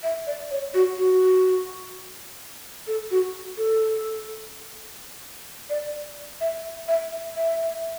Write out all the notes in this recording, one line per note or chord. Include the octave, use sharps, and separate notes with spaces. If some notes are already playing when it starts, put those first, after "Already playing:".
E5
D5
C#5
F#4
F#4
A4
F#4
A4
D5
E5
E5
E5